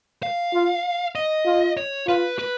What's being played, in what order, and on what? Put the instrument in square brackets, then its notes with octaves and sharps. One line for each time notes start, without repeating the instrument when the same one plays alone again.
[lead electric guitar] F5
[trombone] F4
[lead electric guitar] D#5
[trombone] F4
[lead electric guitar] C#5
[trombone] F4 [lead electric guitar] B4
[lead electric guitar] B4